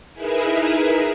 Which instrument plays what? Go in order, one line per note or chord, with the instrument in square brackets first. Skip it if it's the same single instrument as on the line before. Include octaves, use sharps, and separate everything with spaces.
[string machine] D#4 E4 G#4 A#4 B4 E5